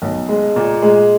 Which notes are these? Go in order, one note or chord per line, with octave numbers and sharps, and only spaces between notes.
B1
G#3
A#2
G#3